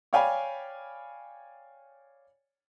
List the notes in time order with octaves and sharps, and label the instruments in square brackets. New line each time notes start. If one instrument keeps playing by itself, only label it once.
[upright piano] C#5 D5 F5 G5 G#5 B5